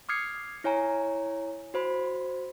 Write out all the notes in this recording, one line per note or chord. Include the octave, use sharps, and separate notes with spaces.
D6 D#6 F6 G#6 C7 C#7
E4 C#5 G#5 A#5
F#4 C5 B5